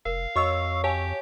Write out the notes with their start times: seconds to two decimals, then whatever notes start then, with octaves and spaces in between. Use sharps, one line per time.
0.06 F1 A#4 F5
0.36 F2 F#4 C#5 D#5 C#6 E6
0.84 G4 C#5 F5 G#5 A5